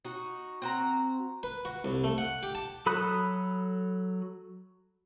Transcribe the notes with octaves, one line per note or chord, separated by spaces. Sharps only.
D#4 F#4
C4 F#4 A#5
B4
F#4
C2
A3
F#5
G4
A5
F#3 A4 B5 D#6 F#6